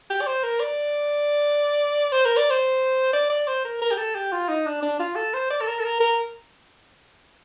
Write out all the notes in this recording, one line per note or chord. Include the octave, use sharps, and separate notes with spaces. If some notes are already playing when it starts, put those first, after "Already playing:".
G4
D5
C5
A#4
D5
C5
A#4
D5
C5
D5
D5
C5
A#4
A#4
G4
A4
G4
F4
D#4
D4
D4
F4
A4
C5
D5
A4
A#4
A4
A#4
A#4